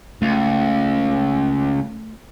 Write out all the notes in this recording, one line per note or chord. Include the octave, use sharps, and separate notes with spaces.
C#2 A3